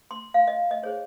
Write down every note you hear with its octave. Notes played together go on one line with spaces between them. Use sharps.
C6
F5
D#5
D#5
D#4 G#4 C5 C#5